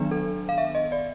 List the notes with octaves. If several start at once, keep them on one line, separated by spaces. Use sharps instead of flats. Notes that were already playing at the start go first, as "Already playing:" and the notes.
Already playing: D#3 F#3 B3 D4
A4
F5
E5
D#5
D5